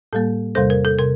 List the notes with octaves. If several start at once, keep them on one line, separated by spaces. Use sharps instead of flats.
A2 G3 A#3 A4
E2 C3 G3 A4 C5
A#4
A4
C3 A#4